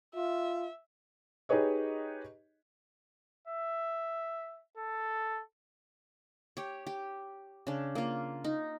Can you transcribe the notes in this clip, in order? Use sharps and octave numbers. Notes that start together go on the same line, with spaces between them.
F4 E5
D#4 G4 G#4 B4 C#5 D#5
E5
A4
G4 C#5
G4
C#3 D4
A#3 F4
D#4